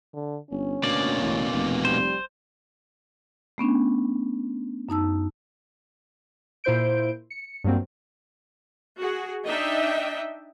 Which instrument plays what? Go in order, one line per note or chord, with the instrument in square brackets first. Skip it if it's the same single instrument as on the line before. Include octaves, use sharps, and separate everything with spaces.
[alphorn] D3
[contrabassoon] G1 [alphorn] C#4
[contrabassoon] D2 [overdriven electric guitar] B2 A#3 [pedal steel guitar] D5
[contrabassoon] A1
F1
[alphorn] G3 [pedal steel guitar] C5
[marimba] A3 B3 C#4 D4
F#2 D#4 A5 E6
[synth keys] A#2 E4 C5 G6 D7
C#7
G2 F#3 A#3 C4
[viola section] F#4 G#4
D4 D#4 D#5 E5 G5